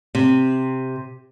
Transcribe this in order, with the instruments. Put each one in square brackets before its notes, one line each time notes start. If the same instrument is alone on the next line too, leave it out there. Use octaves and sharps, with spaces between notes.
[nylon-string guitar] C3